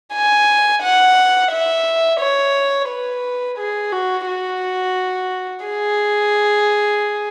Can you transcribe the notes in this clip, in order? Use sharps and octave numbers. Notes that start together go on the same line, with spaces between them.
G#5
F#5
E5
C#5
B4
G#4
F#4
F#4
G#4